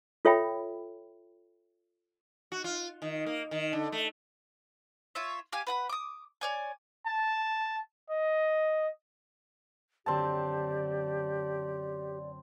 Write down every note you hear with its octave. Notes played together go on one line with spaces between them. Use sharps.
F4 A4 C#5 E5 G5 B5
F#4
F4
D#3
A#3
D#3
D3
A3
F4 C#5 E5
G4 F5 G#5
B4 F#5 B5
D6 D#6
C#5 D5 G#5
A5
D#5
F#2 D3 C4 D4 G4 D5 A5